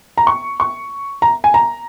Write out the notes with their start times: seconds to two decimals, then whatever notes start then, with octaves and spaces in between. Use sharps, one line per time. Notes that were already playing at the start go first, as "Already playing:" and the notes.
0.18 A#5
0.27 C#6
0.60 C#6
1.22 A#5
1.44 G#5
1.54 A#5